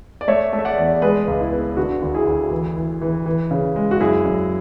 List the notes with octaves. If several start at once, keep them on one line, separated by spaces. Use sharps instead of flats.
D5
A3 C#5 E5
A3
E5
D5 F#5
E2
G#3 G#4 B4
C#2
E4
B3
D3 F#4
D2
E4 G#4
D2
E3
E3
E3
E3
C#3
G#3
F#4
F#2 E4 G#4
F#2